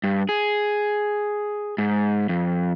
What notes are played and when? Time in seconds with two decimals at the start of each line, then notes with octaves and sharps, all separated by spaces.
0.04 G2
0.29 G#4
1.78 G#2
2.29 F2